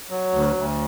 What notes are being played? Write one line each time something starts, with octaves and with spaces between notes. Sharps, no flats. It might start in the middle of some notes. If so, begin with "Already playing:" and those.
F#3
D2
D2